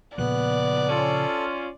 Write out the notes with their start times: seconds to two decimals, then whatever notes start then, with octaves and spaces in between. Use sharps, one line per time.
0.18 A#2 C#3 F3 B3 D5 F#6
0.89 C#4 F4 A4